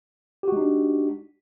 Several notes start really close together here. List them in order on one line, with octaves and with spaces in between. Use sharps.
G4 F#4 G#3 D#4 D4